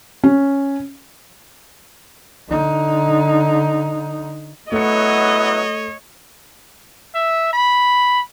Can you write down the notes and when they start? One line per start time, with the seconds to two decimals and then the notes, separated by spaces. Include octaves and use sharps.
0.24 C#4
2.48 D3 D#4
4.72 F#3 A3 B3 E4 C#5 D#5 C#7
7.14 E5
7.53 B5